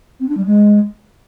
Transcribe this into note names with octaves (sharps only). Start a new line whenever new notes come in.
C4
D4
G3
G#3